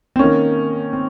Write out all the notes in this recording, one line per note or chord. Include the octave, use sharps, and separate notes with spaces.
C4
D#3 A#3 C#4
C4